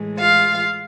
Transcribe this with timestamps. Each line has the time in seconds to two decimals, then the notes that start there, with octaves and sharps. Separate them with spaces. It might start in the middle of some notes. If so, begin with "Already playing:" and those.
Already playing: A2 E3 G#3
0.19 F4 F5